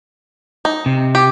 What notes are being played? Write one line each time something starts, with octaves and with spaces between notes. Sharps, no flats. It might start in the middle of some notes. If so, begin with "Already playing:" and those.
D#4
C3
G4